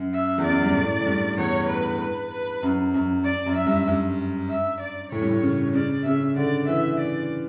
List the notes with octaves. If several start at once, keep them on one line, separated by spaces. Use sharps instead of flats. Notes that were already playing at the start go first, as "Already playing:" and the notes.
Already playing: F#2
E5
E2
D5
F#2
G2
A2
A2
G2
E2 C#5
B4
B4
B4
F#2
F#2
D5
F#2
E5
G2
G2
E5
D5
A2 C#5
G2
A2
C#3
C#3 D5
C#3 E5
D3 D5
E3 E5
D5